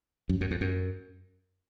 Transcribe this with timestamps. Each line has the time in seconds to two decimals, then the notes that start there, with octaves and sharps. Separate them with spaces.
0.29 F#2
0.41 F#2
0.51 F2
0.61 F#2